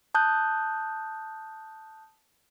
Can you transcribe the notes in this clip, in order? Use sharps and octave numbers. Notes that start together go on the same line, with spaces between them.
A5 D#6 F#6 G6